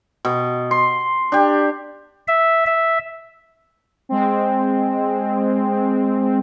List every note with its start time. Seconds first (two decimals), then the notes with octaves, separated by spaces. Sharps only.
0.25 B2
0.71 C6
1.32 D4 G4
2.28 E5
2.66 E5
4.09 G#3 C4